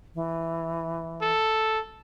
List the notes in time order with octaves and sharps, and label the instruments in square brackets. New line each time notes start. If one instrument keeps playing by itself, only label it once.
[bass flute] E3
[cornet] A4